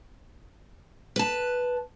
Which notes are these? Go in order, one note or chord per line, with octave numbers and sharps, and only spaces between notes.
B4 A5